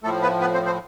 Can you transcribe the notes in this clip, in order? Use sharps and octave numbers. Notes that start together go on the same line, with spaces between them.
A2 F3 A3 A4
B3 B4
B3 B4
C4 C5
C4 C5